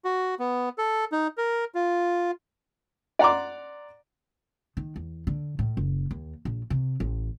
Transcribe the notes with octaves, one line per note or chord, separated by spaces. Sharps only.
F#4
B3
A4
D#4
A#4
F4
D5 F#5 A#5 C6 D6
D#3
E2
D3
A2
F#1
D#2
A#1
C3
A1